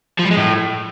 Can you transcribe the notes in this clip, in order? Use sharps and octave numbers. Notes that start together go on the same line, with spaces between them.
F3
G3
G#3
A2